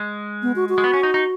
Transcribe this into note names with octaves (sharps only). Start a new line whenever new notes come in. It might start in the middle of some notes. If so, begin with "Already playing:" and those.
Already playing: G#3
B3
F#4
F#4
G#3
B3
C#4
D#4
D#4